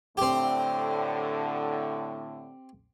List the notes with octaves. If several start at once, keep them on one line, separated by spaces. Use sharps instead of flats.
A2 D3 C4 G4